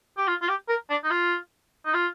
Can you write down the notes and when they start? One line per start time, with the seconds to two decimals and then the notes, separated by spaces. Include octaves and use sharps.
0.18 G4
0.28 F4
0.42 F4
0.49 G4
0.69 A#4
0.90 D4
1.04 D#4
1.10 F4
1.85 D#4
1.94 F4